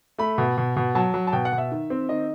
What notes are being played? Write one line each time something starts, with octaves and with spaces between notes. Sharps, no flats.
A3 B5
B2
B2
B2
F#3 A5
F#3
A5
B2 G5
F#5
B2
E5
D#3
C4
D#3 D#5